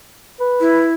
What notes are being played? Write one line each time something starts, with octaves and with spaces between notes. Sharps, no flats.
B4
E4